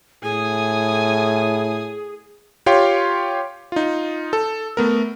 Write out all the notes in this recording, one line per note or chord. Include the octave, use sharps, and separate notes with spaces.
A2 G#4 G#5 D#6
F4 G4 C#5 F5 G5 C6
D#4 F4
A4
A3 B3 A#4